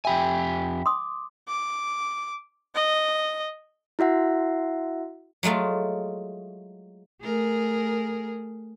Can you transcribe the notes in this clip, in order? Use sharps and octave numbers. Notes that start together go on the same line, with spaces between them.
F2 G4 E5 G5 G#5 B5
C6 D6 D#6
D6
D#5
E4 F#4 E5 F#5
F#3 G#3 A3 F4
A3 G#4 A#4